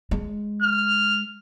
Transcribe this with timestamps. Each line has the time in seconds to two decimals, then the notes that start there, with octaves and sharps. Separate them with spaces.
0.11 G#3
0.62 F6